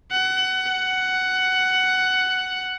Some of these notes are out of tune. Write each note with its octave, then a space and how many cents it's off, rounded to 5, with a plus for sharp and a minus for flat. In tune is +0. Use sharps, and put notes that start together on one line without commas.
F#5 +25
F#5 +10